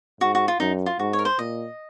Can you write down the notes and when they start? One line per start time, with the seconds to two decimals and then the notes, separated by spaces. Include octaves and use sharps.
0.21 G#2 F#4
0.35 F#4
0.48 F4
0.60 F#2 D#4
0.86 F4
0.99 G#2 F#4
1.13 C#5
1.19 A#4
1.25 C5
1.39 A#2 D#5